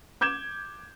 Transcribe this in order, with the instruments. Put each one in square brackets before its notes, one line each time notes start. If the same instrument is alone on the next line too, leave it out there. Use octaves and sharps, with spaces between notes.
[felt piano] D6 G6 G#6 E7